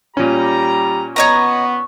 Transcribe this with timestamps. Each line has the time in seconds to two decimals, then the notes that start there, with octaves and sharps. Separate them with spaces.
0.17 A#2 G3 C#4 G4 A#5
1.16 B3 C#5 D#5 A#5 C#6